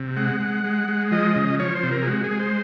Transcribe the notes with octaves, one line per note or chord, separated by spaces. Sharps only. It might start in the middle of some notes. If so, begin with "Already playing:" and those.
Already playing: C3
G#3 F#5
G#3
G#3
G#3
F3 D#5
C#3
F3 C#5
C5
C3
A#4
G#4
G#3 F#4
G#4
G#3
C5